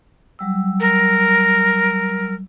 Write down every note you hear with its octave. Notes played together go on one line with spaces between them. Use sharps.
F#3 G3 E6
A#4